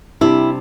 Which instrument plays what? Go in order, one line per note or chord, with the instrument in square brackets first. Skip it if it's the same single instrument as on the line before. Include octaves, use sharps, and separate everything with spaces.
[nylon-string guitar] C3 G3 D4 E4